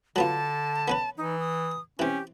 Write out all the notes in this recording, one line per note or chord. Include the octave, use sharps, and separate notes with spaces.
D3 F#3 B3 F4 A5
B3 C#4 B4
E3 D#4
D#6
E3 C4 C#4 G4